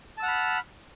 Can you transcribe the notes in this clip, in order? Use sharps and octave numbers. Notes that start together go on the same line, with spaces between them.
F#5 A5 B5 E6 F6